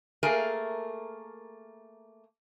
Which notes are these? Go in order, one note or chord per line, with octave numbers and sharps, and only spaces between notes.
A3 A#3 G#4 A#4